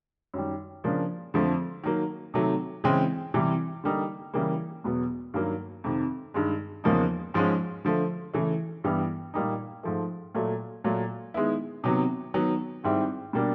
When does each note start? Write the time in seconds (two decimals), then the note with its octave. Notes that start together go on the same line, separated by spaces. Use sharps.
0.34 F#2 D#3 G3
0.84 C#3 F3 A#3 D4
1.34 F2 D3 F3 A3
1.84 D#3 F#3 A#3
2.34 C3 D#3 F#3 A3
2.84 C#3 E3 G#3 C4
3.34 C3 E3 G3
3.84 D3 G3 A#3 D#4
4.34 C#3 E3 G3 A#3
4.84 E2 B2 F#3 B3
5.34 G2 D#3 F#3 A#3
5.84 F2 C3 D#3
6.34 G2 D#3 G#3
6.84 E2 C#3 F3 A#3 D#4
7.34 G#2 F3 G#3 C#4
7.85 D3 F3 A3
8.34 C#3 E3 A3
8.84 G2 E3 G3 B3
9.34 A#2 G3 A#3 D#4
9.83 G#2 F3 A3
10.35 A#2 F#3 A3
10.84 A#2 F#3 A3
11.34 D#3 G#3 B3 E4
11.84 C3 D#3 F#3 B3
12.34 D#3 F#3 B3
12.84 G#2 D#3 G3 C4 E4
13.33 B2 G3 A#3 D4